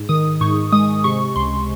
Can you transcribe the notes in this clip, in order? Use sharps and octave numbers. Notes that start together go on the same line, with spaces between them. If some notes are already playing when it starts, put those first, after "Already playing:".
Already playing: G#2
D#3 D#6
G#2 C#6
G#3 D#6
C3 C#6
C#2 C6